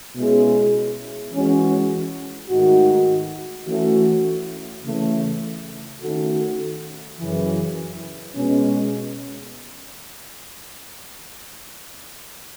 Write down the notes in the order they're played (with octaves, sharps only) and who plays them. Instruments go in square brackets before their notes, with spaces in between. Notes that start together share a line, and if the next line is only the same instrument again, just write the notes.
[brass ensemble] B2 G#3 C#4 E4 G#4
E3 G#3 C#4 F#4
G#2 D#3 A3 D#4 F#4
E3 A3 C#4 F#4
C#3 E3 A3
D#3 A3 C#4 F#4 A4
F#2 C#3 E3
B2 G#3 C#4